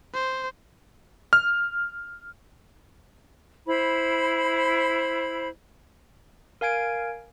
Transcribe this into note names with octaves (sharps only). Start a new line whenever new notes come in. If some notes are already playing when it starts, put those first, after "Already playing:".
C5
F6
E4 C5 B5
A#4 F5 G#5 G#6 D7